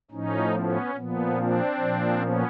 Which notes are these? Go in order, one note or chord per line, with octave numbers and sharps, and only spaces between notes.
A2 F3 C#4 D#4
B3 C#4
A#2 F3 B3
C4 D4
A#2 F3
B3 C#4